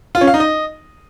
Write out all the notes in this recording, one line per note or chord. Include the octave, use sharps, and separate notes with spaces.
F4
C#4
F5
D#4
D#5